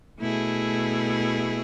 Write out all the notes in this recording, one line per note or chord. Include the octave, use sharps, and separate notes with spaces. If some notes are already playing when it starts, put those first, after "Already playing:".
B2 A3 E4 G#4